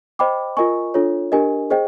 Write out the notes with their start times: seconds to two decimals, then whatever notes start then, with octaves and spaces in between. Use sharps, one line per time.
0.19 C5 D#5 G5 B5 D6
0.57 F4 A#4 D#5 G#5 C#6
0.94 D4 F4 A4 C#5
1.32 D4 G4 A#4 D#5 G#5
1.70 G#4 C5 D#5 G5